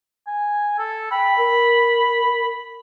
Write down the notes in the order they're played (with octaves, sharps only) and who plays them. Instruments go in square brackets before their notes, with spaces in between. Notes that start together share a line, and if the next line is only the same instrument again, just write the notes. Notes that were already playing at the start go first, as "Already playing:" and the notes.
[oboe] G#5
A4
[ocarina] G5 [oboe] B5
[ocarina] A#4